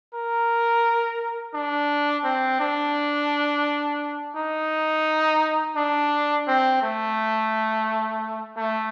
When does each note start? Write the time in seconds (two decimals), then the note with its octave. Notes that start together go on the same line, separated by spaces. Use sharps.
0.14 A#4
1.54 D4
2.24 C4
2.60 D4
4.36 D#4
5.76 D4
6.47 C4
6.82 A3
8.58 A3